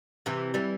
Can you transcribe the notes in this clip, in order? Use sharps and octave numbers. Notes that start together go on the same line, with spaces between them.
C3 E3
E3 G3